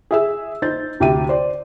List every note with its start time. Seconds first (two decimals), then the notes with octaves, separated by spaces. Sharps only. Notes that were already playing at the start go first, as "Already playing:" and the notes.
0.11 G#4 E5 E6
0.62 D#4 C5 G6 A6
1.00 D2 C3 G4 E5 D#7
1.29 C5 D5